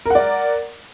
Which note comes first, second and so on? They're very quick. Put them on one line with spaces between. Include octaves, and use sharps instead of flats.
A#4 F#5 D5